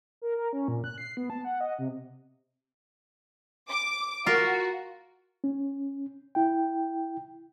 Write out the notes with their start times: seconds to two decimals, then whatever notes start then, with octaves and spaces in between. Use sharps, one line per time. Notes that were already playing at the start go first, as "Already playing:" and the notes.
0.22 A#4
0.37 A#4
0.53 C#4
0.68 A#2
0.84 F#6
0.98 C7
1.17 B3
1.30 A5
1.44 F#5
1.61 D#5
1.79 C3
3.70 D6
4.26 F4 F#4 A#4
5.44 C#4
6.35 E4 G5